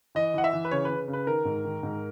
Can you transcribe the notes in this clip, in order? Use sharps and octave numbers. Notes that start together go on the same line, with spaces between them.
E3 D#5
E3 F#5
E5
E3
B4
C#3 C#5
C#3 B4
C#3
B4
D#3 A#4
G#2
D#3
G#2